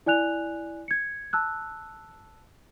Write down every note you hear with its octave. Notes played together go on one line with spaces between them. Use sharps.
E4 D5 G#5 F#6 F7
G#6 C#7
A5 E6 F#6